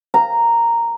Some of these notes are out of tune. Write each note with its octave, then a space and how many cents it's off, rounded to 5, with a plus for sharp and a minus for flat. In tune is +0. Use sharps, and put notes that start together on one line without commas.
A#5 -5